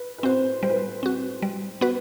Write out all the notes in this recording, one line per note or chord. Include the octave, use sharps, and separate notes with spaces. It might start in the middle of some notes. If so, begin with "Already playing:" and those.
Already playing: B4
B4
C4 F#4 C5
G3 C5
B4
C5
C4 F#4
G3
B3 F#4 B4